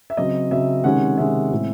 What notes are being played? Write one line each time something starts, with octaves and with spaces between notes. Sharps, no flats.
E5
C#3 F#3 C4 D#5
C#3 F#3 C4 E5
C3 D#3 G#3 C#4 F#5
C3 D#3 G#3 C#4 E5
A2 G#3 C4